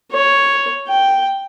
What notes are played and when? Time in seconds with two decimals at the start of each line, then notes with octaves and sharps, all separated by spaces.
0.12 C#5
0.88 G5